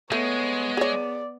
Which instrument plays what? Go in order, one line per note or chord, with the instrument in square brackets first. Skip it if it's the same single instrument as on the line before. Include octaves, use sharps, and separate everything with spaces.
[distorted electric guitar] G#3 [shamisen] A3 [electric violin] B3 [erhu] C#5
[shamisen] G#4 C#5 [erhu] D5